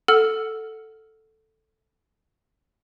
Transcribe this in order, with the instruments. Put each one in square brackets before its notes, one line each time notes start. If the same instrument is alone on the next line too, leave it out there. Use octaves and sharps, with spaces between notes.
[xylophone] A4 F#5 E6 F6